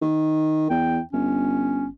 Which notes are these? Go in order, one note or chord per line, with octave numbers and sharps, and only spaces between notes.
D#3
E2 G5
G1 C#4